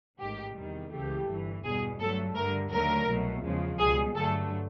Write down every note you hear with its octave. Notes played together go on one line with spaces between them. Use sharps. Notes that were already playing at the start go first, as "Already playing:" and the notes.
A1 G#2 D#3 G4
E2 C3 D#3 G3
C#2 C#3 E3 A3 G4
G1 G2 E3
E2 B2 G3 G#4
G2 D3 F#3 A3 A4
G2 D3 G3 A#4
D#2 D3 F#3 A3 A#4
C2 B2 F#3 A3
E2 C#3 F3 G#3
C#2 B2 G3 G#4
G2 D3 F#3 A3 A4